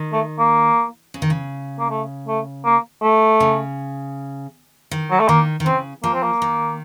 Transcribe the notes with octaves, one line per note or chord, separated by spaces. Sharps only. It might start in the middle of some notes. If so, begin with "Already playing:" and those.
Already playing: D#3
A3
A#3
C#3
D#3
C#3
A#3
A3
A3
A#3
A3
C#3
D#3
F#3
A3
D#3 A#3
D#3
C#3 C4
F3 A#3
C4
A#3
D#3